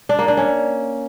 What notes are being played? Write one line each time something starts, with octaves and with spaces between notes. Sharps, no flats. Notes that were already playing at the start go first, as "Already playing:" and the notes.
D4
A#3
D4
C#4